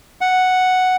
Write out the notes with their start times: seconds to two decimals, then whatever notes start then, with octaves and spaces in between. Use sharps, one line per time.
0.21 F#5